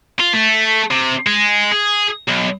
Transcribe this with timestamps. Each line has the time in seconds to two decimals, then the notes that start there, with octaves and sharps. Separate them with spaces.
0.20 F4
0.34 A3
0.91 C3
1.27 G#3
1.72 G#4
2.28 B1